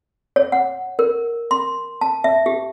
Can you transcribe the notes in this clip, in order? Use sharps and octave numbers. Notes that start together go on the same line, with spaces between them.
C#5
F#5
A#4
C6
A5
E5
G4